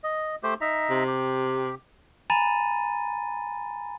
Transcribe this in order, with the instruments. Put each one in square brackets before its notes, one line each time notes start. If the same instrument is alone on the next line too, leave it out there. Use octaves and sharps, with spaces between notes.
[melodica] D#5
A3 G4 C5
D#4 E5 A#5
[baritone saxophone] C3
[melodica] G4
[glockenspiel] G#5 A#5 B5 A6 D#7